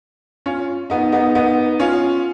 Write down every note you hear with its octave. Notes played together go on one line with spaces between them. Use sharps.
C#4 F4
B3 D#4
B3 D#4
B3 D#4
C#4 F4